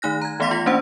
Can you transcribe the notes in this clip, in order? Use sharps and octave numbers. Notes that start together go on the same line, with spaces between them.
D#3 A3 D#4 F#6 A#6
A#5 G#6
E3 A3 B3 F5 C6 B6
F4 A#6
A3 A#3 C#4 D4 C5 F#5